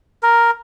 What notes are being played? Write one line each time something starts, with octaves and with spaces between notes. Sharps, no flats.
A#4